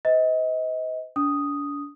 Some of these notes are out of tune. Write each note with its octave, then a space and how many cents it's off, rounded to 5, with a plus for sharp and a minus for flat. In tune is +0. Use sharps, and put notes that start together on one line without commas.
C5 -45 D#5 +35
D4 -35 D#6 +0